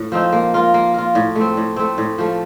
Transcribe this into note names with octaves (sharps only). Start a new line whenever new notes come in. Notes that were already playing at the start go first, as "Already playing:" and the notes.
Already playing: A2
F3 C4 D#4
A#3
F4 A#4
A#3
F4 A#4
A2
A3 C4
A2
A3 C4
A2
F3 A3